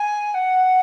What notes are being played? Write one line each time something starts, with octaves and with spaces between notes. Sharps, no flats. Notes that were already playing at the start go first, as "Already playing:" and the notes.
Already playing: G#5
F#5